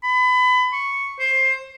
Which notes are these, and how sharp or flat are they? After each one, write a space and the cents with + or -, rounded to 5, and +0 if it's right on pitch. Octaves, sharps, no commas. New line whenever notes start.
B5 +25
C#6 +0
C5 +15